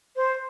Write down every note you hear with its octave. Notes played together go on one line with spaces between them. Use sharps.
C5